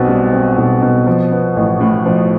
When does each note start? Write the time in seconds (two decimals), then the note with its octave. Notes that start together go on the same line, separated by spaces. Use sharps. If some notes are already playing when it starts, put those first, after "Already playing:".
Already playing: B1 B2 C4
0.08 G3
0.33 C4
0.58 B1
0.82 B2
1.07 F3
1.31 B3
1.56 A1
1.80 A2
2.06 F3